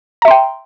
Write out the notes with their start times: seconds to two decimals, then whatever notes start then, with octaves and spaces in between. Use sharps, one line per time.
0.22 A#5
0.25 E5
0.28 C6
0.31 G5